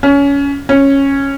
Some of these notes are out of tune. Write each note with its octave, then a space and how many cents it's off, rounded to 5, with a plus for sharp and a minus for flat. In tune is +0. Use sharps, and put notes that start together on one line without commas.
C#4 +20
C#4 -10